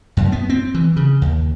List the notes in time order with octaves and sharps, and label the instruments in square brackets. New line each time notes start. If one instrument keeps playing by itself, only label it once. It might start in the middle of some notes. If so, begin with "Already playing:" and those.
[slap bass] F#2
B3
C4
E3
C#3
D#2